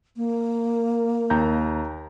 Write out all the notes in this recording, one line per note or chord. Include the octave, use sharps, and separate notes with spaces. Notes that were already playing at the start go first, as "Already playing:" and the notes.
A#3
D#2 A#5 G6